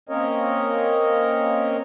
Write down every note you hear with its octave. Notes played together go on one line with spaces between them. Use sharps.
A#3 C4 C#4 A#4 C#5 D#5